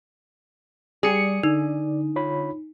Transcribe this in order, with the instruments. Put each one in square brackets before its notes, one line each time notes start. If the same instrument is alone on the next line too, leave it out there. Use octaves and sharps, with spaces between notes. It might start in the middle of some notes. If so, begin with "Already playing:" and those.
[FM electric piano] G3 C#7 [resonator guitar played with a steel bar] G#4 [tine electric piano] D5
[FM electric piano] D3 [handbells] D#4
[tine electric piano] F4 C#5 B5